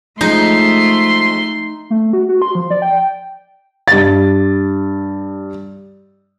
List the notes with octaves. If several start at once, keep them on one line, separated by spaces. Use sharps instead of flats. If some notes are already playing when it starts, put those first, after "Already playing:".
F3 G#3 A3 D#4 C6
A3
F#4
F#4
C6
F3
D5
G5
G2 A6